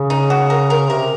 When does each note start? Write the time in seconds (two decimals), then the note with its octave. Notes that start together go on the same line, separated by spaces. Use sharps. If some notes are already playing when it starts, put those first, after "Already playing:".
Already playing: C#3
0.10 D#4
0.30 F#4
0.50 A#4
0.70 A#4
0.89 C3 A#4